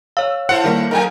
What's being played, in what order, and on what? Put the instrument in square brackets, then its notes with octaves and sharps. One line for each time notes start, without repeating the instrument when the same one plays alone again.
[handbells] C#5 F5 [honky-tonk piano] E6
[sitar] E4 A4 C5 [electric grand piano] F#5
[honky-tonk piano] D#3 G3 A#3
[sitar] F#3 A#3 D#4 [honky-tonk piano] A#4 G5 G#5